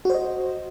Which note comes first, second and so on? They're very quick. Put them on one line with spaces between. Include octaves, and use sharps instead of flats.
F#4 C5 D#5